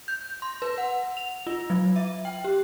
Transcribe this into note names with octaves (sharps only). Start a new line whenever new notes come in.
G6
C6
B4
F#5
F7
F4
F#3
E5
G5
G4